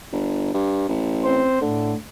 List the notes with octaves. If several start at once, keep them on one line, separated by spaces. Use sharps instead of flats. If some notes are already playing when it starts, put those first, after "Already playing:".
G1
G2
A1
C4 C5
A2 D3